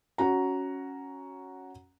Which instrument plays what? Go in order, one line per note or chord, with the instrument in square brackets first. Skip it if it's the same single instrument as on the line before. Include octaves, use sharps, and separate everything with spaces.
[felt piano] C#4 F#4 A#5